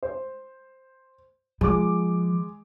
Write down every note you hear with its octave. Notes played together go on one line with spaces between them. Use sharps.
C5
F3 G#3 D6